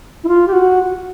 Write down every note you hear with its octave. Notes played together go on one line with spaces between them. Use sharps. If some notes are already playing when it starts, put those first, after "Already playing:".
E4
F4
G4
F#4